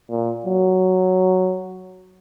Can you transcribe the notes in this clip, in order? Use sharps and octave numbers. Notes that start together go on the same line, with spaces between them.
A#2
F#3